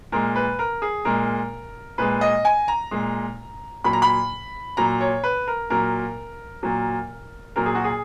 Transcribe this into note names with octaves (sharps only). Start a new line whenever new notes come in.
A#2 G#3 A#4
B4
A#4
G#4
A#2 G#3 A#4
A#2 G#3 B4
D#5
G#5
A#5
A#2 G#3
A#2 F#3 B5
A#5
B5
A#2 F#3 A#5
C#5
B4
A#4
A#2 F#3 A#4
A#2 F#3
A#2 F#3 A#4
G#4
F#4
G#4